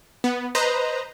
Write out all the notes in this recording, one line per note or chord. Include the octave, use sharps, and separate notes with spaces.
B3
B4 C5 D#5 A#5